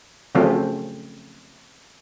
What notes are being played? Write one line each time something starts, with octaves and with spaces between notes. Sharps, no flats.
C#3 F3 F#3 A3 C4 C#4